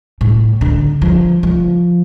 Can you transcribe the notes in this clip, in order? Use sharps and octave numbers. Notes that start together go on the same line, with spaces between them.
A2
D3
F3
F3